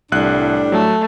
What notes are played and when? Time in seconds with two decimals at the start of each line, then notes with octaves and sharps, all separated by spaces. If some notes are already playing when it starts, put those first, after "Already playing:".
0.12 C2 A2 G3 D4 F#6
0.72 F#3 A3